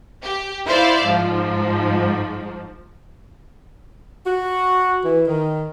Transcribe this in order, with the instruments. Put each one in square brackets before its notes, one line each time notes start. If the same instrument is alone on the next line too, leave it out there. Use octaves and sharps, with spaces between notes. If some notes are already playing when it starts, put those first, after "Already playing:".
[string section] G4
E4 C5 D5 E5 F5
G#2 F3
[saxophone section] F#4
E3
D#3